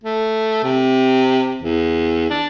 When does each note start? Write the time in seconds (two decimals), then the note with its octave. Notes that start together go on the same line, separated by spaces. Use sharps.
0.04 A3
0.64 C3
1.62 E2
2.30 D4